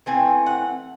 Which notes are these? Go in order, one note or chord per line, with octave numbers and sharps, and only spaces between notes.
E3 A3 C4 G#5
F#5